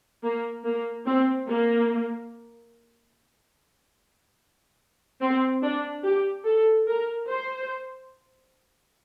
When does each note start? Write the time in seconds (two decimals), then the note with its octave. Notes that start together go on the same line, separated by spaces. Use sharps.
0.22 A#3
0.64 A#3
1.06 C4
1.47 A#3
5.21 C4
5.62 D4
6.04 G4
6.45 A4
6.87 A#4
7.28 C5